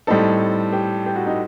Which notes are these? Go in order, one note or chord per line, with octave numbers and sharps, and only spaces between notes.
A2 G3 C4 D#4 A4
G4
G4
F#4
D#4